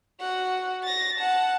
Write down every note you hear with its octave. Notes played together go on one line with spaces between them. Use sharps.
F#4 F#5
A6 A#6
F#5 A5